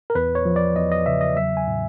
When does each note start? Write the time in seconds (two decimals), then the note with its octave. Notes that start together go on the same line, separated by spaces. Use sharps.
0.10 A#4
0.15 E2 B4
0.35 C#5
0.45 F3
0.56 D5
0.76 E2 D#5
0.92 D#5
1.06 C#3 E5
1.21 D#5
1.36 F#3 E5
1.57 G#5
1.67 A2